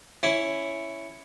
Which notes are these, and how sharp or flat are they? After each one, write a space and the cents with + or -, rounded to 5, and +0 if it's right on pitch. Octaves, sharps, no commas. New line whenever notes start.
C#4 +0 E4 +5